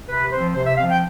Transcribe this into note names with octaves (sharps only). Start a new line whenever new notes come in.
C3 B4
F3 C4 C5
C3 C5
E5
F3 C4 F5
G5